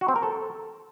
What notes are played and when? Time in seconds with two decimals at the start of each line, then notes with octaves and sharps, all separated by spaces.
0.01 F#4
0.08 C4
0.16 A#4
0.23 A4